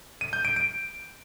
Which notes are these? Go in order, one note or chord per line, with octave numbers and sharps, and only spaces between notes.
D#7
G6
D7
D7